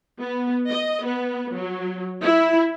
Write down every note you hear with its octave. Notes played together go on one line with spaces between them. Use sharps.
B3
D#5
B3
F#3
E4